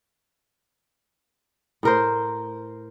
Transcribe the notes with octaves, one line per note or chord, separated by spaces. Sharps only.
A2 A#4 C5